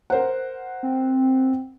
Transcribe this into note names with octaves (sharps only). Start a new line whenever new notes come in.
A#4 C5 F#5
C4